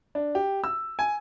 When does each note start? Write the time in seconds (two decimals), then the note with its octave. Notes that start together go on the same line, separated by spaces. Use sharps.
0.15 D4
0.35 G4
0.64 E6
0.99 G#5